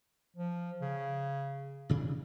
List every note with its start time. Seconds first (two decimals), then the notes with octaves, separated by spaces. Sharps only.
0.37 F3
0.81 C#3
1.89 A1 C3 D4